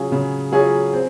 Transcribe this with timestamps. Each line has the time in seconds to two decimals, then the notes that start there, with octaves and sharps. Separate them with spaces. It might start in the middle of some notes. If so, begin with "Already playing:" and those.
Already playing: C#3 F#3 C#4 F4 G#4
0.12 C#3
0.52 F#3 C#4 F4 G#4
0.93 C4